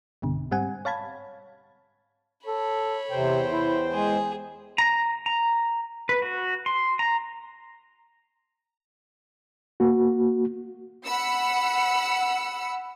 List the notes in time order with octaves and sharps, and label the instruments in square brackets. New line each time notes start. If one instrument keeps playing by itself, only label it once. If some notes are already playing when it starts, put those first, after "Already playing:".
[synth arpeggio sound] B1 G2 B2 D3
G#2 G3 C4 F#5 G#5
C#5 F5 A5 B5 G#6
[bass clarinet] A4 [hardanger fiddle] C#5 B5
[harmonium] E2 C5 G5 [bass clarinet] C3
[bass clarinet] E4
[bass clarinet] G#3 [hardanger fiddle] G#4
[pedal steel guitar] A#5
A#5
B4
F#4
C6
A#5
[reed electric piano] A#3 F#4
[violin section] F#5 B5 E6 C#7